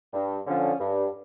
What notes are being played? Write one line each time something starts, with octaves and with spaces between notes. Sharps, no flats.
G2
D3 F3 C#4
G2